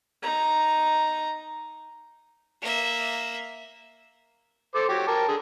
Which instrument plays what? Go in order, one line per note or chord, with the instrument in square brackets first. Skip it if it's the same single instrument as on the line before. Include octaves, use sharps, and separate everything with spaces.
[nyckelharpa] D#4 A#5
[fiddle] A#3 E5
[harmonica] A4 C5 D6
F#3 G4 G5
A#4 G5 A5
D3 G#4